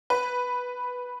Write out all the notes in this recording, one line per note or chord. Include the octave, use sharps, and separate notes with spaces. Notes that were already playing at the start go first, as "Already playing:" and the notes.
B4